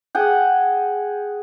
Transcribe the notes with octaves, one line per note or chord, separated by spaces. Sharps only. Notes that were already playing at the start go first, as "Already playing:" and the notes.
G#4 F#5 G5